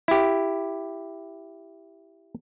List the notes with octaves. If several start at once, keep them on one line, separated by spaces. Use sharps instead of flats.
E4 G4